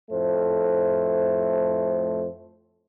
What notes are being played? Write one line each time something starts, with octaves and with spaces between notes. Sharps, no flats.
F2 A2 A3 C5